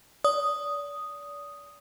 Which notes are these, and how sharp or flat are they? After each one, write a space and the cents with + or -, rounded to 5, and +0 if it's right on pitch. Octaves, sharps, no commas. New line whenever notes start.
D5 -35 D#6 +0